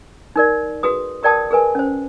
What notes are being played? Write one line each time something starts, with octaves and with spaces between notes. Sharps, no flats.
D#4 A#4 D5
F#4 G#4 B4 D#6
G4 A#4 D5 G5 A5 D#6
G#4 A#4 B4 G#5
C#4 C5